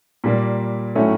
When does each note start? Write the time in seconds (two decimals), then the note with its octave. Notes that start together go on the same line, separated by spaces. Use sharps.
0.24 A#2 G3 A#3
0.95 A2 F#3 A3 C#4 E4